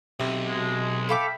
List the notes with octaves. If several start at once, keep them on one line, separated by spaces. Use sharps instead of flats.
B1 C3
B2 G#3
A4 E5 F5 G5 B5 D6